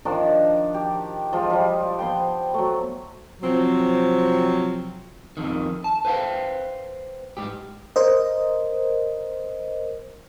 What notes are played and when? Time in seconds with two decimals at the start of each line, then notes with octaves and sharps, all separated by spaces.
0.05 D#3 F3 D4
0.74 G4
1.33 F3 G#3
1.50 F3 G3
1.99 B3 C5 G5
2.54 F#3 A3
3.41 C3 F3 F#3 C4
5.37 F2 D#3
5.84 A5
6.05 B4 C5 F5 G5
7.37 G#2 G4
7.96 A#4 C5 D#5